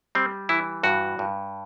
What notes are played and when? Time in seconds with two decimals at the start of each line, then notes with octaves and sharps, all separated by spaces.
0.15 G3 C4
0.49 E3 E4
0.83 G2 F#4
1.19 G2